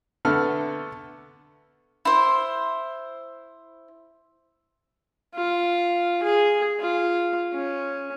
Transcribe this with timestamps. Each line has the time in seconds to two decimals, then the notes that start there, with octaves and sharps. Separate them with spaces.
0.25 D3 A3 B3 A4 F6
2.05 E4 C5
5.35 F4
6.23 G#4
6.80 F4
7.53 C#4